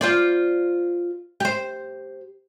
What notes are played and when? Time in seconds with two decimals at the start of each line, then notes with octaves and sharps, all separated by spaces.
0.01 F4 C5 D5
1.40 G4 C5